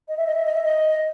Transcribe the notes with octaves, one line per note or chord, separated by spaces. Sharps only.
D#5
E5
D#5
E5
D#5
E5
D#5